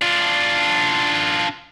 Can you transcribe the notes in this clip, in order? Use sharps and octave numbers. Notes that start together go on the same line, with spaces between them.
D4 F4